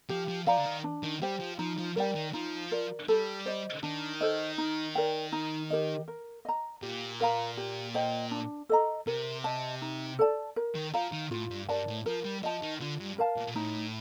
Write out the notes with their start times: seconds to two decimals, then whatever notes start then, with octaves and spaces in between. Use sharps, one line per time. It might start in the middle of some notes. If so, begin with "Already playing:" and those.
0.09 F3 G4
0.28 F3
0.46 F3 D5 F5 A#5
0.57 D3
0.65 D#3
0.84 D4
1.03 D#3
1.22 G3 G4 C5 G5
1.40 F3
1.59 F3 D#4
1.78 F3
1.96 G3 A#4 D5 G5
2.15 D#3
2.33 F3 D#4
2.71 A#4 D5
3.08 G3 A4
3.46 C5 D#5
3.83 D#3 D4
4.21 A4 C5 D#5
4.58 D#4
4.95 A#4 D5 G5
5.32 D#4
5.70 G4 A#4 D#5
6.08 A#4
6.45 D#5 A#5
6.82 A#2 G4
7.20 A#4 F5 A#5
7.57 G4
7.94 C5 D#5 G5
8.31 D4
8.69 A4 D#5 A#5
9.07 C3 A#4
9.44 D#5 A5
9.82 D#4
10.19 A4 D5 A5
10.56 A#4
10.75 D#3
10.94 F3 F5 A#5
11.12 D#3
11.31 A2 F4
11.50 G2
11.69 G2 A#4 D5 A5
11.87 A2
12.06 F3 A#4
12.24 G3
12.43 F3 D#5 A5
12.62 D#3
12.80 D3 F4
12.99 G2
13.18 A#4 F5 A5
13.37 A#2
13.47 A#2
13.55 A2 D#4